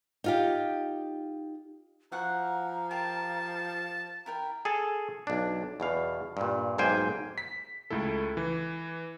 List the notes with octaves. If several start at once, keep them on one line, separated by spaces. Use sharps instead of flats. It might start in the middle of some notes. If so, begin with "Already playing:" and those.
D#4 F4 G4
F3 F#4 F#5 A#5
F4 G4 A#4 A5
E4 A#4 G5 A#5
G#4 A4 A5
B1 D4
E2 B2 F5
G2 A#2
B1 G#2 A#3 C5 G5 G#5
B6
C#2 A3 E4 A4
E3